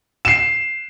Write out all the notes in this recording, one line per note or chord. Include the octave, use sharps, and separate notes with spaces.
C7 E7